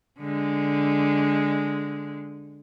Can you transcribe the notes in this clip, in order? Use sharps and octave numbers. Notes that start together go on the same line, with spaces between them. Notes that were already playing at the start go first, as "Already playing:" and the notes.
D3 G#3